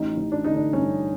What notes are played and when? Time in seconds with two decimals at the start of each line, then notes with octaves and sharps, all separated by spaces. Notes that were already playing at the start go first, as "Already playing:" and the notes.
Already playing: A1 D#4
0.17 A1
0.32 D4
0.44 D3 D#4
0.56 D4
0.73 G2 C#4